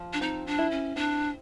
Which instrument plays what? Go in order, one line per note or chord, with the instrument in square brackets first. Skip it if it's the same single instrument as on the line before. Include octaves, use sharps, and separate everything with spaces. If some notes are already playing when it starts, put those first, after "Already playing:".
Already playing: [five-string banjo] F3
[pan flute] D4
[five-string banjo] C4 [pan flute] D#4
[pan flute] D4
[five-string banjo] E4
[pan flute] C#4
[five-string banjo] C4 [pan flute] D4